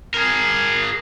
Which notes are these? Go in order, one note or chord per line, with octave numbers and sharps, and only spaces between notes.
G#4 A#4